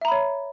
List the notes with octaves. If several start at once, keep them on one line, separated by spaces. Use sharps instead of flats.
C#5 E5 A#5 B5